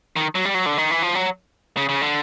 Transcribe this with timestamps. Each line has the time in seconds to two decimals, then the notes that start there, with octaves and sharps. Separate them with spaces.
0.16 D#3
0.35 F#3
0.45 G3
0.54 F#3
0.66 D3
0.78 D#3
0.91 E3
1.02 F3
1.15 F#3
1.77 C#3
1.89 C#3
2.02 D3